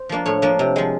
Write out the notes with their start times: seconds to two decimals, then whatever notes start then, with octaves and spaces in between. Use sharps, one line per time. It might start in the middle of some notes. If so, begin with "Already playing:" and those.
Already playing: C5
0.09 F3 A#3 D4
0.26 A2 C#5
0.42 F3 A#3 D4
0.59 C3
0.76 F3 G#3